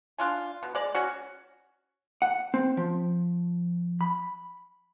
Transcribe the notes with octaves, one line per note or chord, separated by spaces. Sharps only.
D4 F4 G#5
B2
G#3 D5
C#4 F#4
F#5
C4
F3
B5